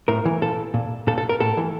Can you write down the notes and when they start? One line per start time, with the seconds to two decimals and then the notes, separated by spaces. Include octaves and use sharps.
0.08 A2 A#4
0.25 E3
0.42 A#2 A4
0.74 A#2
1.07 A#2 A4
1.18 A4
1.29 A#4
1.40 A2 A4
1.57 E3